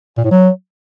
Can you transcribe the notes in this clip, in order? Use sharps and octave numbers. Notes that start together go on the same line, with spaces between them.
A#2
A2
F#3